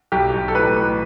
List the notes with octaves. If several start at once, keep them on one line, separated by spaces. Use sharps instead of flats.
B1 G4
B1
A4
A1 B4
A1